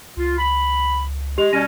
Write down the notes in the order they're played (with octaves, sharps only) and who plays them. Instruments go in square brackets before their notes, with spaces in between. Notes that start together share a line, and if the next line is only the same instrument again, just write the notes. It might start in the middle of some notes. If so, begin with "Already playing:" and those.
[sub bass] C#2 [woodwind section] F4
[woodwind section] B5
[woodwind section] G#3 [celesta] G4 F7
[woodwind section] B2 G3 C#4 [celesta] A#6 D#7